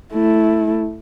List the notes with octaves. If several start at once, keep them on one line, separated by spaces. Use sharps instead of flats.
A3 E4